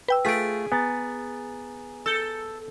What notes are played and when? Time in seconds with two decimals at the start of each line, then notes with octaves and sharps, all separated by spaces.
0.08 B4 G5 E6
0.25 A3 F4 G#4 B6 D7
0.72 B3 G#5 A#5 A6
2.06 A4 E6 G6